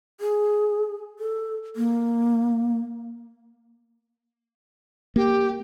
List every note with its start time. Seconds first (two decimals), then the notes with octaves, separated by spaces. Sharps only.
0.21 G#4
1.19 A4
1.76 A#3
5.16 A#3 G4